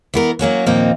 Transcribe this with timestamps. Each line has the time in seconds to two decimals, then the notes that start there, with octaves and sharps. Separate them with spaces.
0.14 E3 B3 A#4
0.39 F#3 A#3 C#4 F#4
0.66 D#2 A#2 F3 A#3 C4 D#4